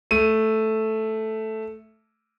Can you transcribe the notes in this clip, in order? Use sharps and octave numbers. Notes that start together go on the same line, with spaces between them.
A3 D#7